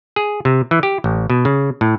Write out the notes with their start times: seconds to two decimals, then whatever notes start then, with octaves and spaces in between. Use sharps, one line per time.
0.16 G#4
0.45 C3
0.71 E3
0.83 G4
1.04 A1
1.30 B2
1.45 C#3
1.81 A2